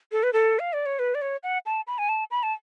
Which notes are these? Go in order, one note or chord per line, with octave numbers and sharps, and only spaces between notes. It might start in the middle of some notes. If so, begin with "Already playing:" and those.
A4
B4
A4
F5
D5
C#5
B4
D5
C#5
F#5
A5
B5
G#5
A5
B5
A5